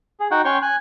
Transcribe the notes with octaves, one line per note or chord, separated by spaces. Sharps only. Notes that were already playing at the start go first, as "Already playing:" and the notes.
G#4
D#4 F#4 F#5 G5
C#4 C#5 G5 C6 C#6
G#5 F#6